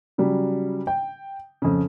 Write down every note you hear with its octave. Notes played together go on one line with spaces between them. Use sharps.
C#3 F#3 G3
G5
F2 C#3